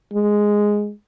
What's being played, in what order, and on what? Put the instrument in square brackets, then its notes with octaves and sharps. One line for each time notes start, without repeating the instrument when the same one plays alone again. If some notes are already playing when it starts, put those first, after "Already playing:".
[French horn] G#3